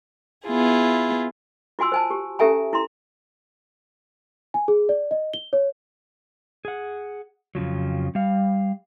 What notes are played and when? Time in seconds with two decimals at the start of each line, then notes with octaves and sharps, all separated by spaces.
0.46 B3 E4 F4 G#4
1.79 F4 F#4 G#5 C6 E6
1.92 C5 G#5 A5
2.10 G4
2.39 C#4 G4 A4 E5 G#5 A#5
2.73 E4 A#5 C6
4.54 G#5
4.68 G#4
4.89 D5
5.11 D#5
5.34 G7
5.53 C#5
6.65 G#4 F#5
7.55 F2 C#3 F3 F#3
8.15 G3 F5